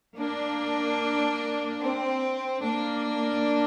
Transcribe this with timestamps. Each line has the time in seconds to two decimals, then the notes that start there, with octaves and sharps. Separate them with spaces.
0.17 A#3 D4
1.82 C4
2.63 A#3 D4